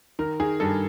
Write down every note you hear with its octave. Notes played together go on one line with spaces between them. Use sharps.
D#3 A#4
D#3 G#4
G2 A4